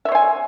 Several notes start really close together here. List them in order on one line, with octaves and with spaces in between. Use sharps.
E5 C#5 C5 G#5